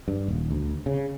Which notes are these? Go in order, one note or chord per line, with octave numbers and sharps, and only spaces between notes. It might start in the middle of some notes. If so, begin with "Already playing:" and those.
G2
D#1
D2
C#3